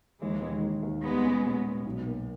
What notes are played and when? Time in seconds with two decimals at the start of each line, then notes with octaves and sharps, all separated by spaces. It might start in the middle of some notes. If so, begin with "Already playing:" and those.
0.22 D#2 E3 G#3
0.42 D#3
0.63 D#2
0.83 D#2
1.04 G3 G#3 B3
1.25 C#4
1.45 A#2
1.65 A#2
1.85 B1
2.06 A#3